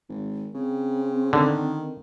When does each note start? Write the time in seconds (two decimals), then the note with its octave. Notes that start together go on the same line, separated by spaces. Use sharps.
0.09 G#1
0.54 C#3 C4
1.33 D3 D#3